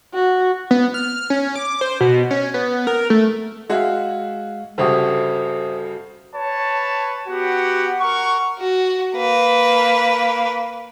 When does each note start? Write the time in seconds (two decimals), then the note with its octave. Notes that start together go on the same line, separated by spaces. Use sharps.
0.15 F#4
0.71 B3
0.94 F6
1.30 C#4
1.56 D6
1.81 C5
2.01 B2
2.31 C#4
2.54 B3
2.87 A#4
3.10 A3
3.70 G#3 F#4 G#4 E5 F5
4.78 G1 C#3 F#4 G4 A4 C5 E5 D#6
6.35 B4 C#5 A5
7.28 B3 F#4 G4 F#5
8.00 A#4 F#5 C#6
8.60 F#4
9.16 A#3 B4